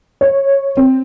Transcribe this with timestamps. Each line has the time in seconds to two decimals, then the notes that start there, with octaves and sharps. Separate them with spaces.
0.21 C#5
0.77 C4